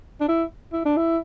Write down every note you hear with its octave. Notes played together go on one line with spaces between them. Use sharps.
D4
E4
E4
D4
E4